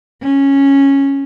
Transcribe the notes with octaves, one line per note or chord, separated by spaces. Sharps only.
C#4